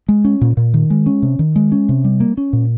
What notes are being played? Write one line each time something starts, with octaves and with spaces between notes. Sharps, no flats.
G#3
C#4
A#2
A#2
D#3
G#3
C#4
C3
D#3
G#3
C#4
C3
G3
A#3
C#4
A#2